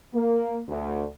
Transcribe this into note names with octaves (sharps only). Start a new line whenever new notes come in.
A#3
D2